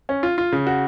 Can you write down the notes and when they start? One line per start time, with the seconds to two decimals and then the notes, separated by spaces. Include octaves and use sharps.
0.09 C#4
0.23 F4
0.38 F4
0.52 C#3
0.67 F#4